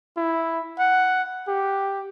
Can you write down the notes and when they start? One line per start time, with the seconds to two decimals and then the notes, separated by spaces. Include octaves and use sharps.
0.17 E4
0.79 F#5
1.48 G4